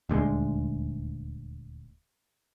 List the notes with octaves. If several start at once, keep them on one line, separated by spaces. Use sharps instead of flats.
D#1 D2 G3 G#3